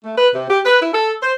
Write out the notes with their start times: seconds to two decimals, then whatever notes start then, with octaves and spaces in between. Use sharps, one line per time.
0.04 A3
0.17 B4
0.35 C3
0.50 G4
0.66 B4
0.81 E4
0.94 A4
1.23 C5